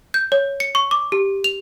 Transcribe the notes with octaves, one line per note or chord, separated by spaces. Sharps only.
G6
C#5
C#7
C#6
D6
G4
F7